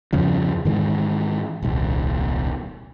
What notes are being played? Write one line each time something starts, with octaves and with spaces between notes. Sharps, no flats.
E2 G2 C#3 F3
G#2 D#3 E3 G#3
D#1 C2